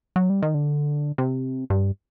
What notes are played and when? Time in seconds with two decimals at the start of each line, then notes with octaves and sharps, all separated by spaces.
0.16 F#3
0.30 G3
0.42 D#3
0.54 D3
1.18 C3
1.70 G2